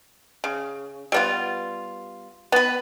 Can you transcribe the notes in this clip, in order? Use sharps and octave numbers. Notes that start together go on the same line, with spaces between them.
C#3
G3 B3 F4
B3 B4